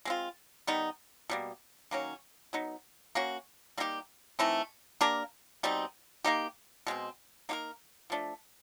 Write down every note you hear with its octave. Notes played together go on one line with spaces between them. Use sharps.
G#3 C4 F4
D#3 G3 B3 D#4
B2 G3 A#3
D#3 F#3 A#3 C#4
F#3 B3 D#4
A#3 C#4 F#4
G3 A#3 D#4 G4
E3 A3 C4 D#4
A#3 D4 G4 A#4
B2 G3 C4 D#4
A#3 D#4 G4
B2 G#3 C4
A#3 D#4 G4 A#4
F3 A3 D4